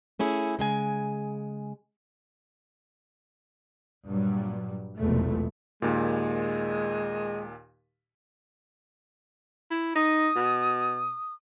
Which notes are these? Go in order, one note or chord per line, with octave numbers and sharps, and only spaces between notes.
A3 C#4 E4 G#4
C#3 G#3 G#5
G2 A#2 F#3 G3
F1 B1 E2 G#3 A3
D#2 A#2 G#3
E4
D#4 D#6
B2